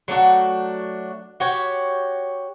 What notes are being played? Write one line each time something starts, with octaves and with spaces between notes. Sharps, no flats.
F#3 A3 D4 F#4
F#4 G4 C#5